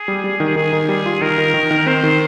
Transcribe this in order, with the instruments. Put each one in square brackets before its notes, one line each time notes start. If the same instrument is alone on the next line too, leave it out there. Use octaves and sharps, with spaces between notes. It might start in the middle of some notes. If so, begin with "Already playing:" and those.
Already playing: [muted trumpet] G#4
[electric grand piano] G3
G3
D#3
[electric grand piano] D#3 [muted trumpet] G#4
[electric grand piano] D#3
G3
F4
[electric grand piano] D#3 [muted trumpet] A#4
[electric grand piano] D#3
D#3
D#3
[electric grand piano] C4 [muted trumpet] C5
[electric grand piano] D#3